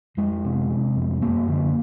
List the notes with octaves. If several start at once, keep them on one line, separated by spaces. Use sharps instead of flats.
F2 G#3
C3
C3
F2
F#2 A#3
D3